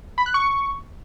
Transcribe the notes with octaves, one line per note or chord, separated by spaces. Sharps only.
B5
F#6
C#6